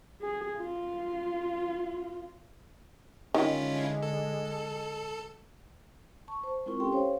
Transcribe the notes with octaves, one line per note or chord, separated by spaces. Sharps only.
G#4
F4
D3 D#3 G#3 C#4 E4 F4
A4
A5 C#6
C5
G#3 C4 E4 F4 A#4 C#6
C#4 G4 A4 G5 C6
C5 C#5 F5